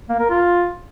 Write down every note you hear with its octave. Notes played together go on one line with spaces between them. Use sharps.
A#3
A#4
F4